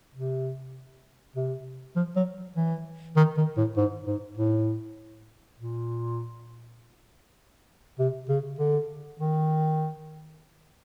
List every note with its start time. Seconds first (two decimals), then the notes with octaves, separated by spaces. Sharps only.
0.15 C3
1.36 C3
1.96 F3
2.16 F#3
2.56 E3
3.16 D#3
3.37 D#3
3.57 A2
3.77 G#2
4.07 G#2
4.37 A2
5.58 A#2
7.99 C3
8.29 C#3
8.59 D3
9.20 D#3